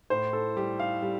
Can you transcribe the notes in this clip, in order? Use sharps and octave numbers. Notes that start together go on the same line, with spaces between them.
A2 C5
A4
G3 G4
F5
G3